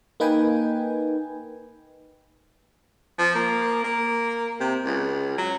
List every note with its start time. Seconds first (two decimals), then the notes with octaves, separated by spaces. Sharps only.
0.20 A#3 D#4 B4 G5 G#5
3.19 F3
3.35 A#3
3.84 A#3
4.60 C3
4.85 C#2
5.38 F#3